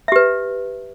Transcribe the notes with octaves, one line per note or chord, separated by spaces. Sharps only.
G4 B4 E5